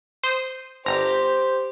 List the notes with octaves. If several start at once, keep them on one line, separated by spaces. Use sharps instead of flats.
C5 D#6
G1 G4 C5 A#5